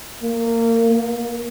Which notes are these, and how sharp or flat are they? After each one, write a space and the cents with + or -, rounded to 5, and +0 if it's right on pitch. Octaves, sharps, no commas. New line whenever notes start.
A#3 -25
A#3 +25